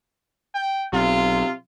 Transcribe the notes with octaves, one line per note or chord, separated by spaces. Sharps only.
G5
B1 C3 F4